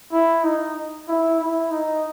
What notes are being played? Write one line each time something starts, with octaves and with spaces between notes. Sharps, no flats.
E4
D#4
E4
E4
D#4